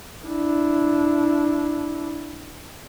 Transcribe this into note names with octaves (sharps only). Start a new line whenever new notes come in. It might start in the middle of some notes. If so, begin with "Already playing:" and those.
D4 E4